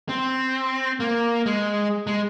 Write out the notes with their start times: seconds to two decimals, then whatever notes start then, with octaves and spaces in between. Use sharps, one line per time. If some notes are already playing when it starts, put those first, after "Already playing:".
0.09 C4
1.00 A#3
1.46 G#3
2.07 G#3